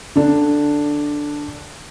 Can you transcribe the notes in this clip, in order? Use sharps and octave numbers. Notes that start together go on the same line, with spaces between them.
D3 D4